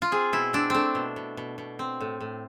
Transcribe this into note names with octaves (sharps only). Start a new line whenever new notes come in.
F4
C4 G#4
B2 E4
C4 D4
A3 C4 D4
B2
B2
B2
B2
C4
A2
A2